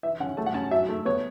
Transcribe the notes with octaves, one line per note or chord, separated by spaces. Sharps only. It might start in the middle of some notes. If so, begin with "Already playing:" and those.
E3 E5
C#4 F#5
A3 A5
F#5
C#4 A5
F#3 E5
A3
B3 C#5